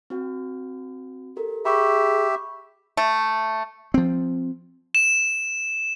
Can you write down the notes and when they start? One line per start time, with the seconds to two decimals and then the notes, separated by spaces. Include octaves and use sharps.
0.10 C4 F#4 G5
1.37 G4 A4 A#4
1.65 G4 G#4 E5 B5 C#6
2.97 A3
3.94 F3 C4
4.95 E7